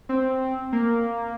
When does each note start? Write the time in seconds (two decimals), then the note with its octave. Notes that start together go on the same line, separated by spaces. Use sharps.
0.09 C4
0.72 A#3